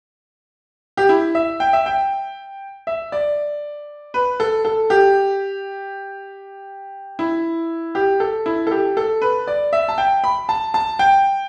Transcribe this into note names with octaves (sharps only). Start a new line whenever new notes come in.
G4
E4
E5
G5
E5
G5
E5
D5
B4
A4
A4
G4
E4
G4
A4
E4
A4
G4
A4
B4
D5
E5
A5
G5
B5
A5
A5
G5